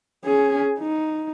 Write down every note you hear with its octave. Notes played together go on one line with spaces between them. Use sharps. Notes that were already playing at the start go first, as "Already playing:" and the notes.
C#4 G#4
D#4